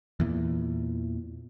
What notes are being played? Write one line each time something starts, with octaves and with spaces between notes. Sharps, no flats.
E2 A#2 E3